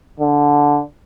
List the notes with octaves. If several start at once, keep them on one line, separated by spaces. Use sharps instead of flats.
D3